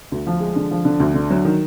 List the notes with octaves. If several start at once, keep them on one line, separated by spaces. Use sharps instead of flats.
D2
F3
G#3
D3
F3
D3
D2
D3
F#3
D#3